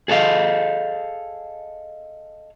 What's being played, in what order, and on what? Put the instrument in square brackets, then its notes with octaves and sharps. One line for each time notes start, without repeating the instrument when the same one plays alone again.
[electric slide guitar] G#4 A4 D#5 F5